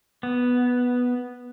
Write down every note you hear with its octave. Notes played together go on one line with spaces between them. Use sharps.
B3